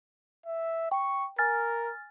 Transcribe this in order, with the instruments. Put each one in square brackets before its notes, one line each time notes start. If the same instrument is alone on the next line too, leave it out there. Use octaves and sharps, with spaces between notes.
[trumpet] E5
[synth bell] G5 [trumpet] C#6
[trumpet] A#4 [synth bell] G#5 F6 A6